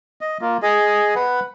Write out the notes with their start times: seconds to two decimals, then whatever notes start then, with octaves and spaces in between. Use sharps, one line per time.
0.21 D#5
0.41 A#3 F4
0.63 G#4 D#5
1.16 B4 F#5